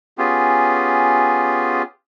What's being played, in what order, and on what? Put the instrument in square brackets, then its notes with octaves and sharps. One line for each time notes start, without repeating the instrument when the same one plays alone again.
[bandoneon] B3 C#4 F4 G4 G#4